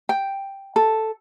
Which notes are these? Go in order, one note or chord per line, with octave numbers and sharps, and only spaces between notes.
G5
A4